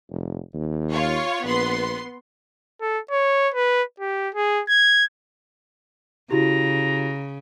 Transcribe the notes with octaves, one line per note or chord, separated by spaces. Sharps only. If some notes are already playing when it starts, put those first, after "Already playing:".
F1
D#2
F4 C#5
A#1 B3 C6
A4
C#5
B4
G4
G#4
G#6
C#3 E4 F#4 G4 A#5